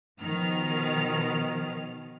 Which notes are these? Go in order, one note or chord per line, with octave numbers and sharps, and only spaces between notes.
B2 D#3 F3 F6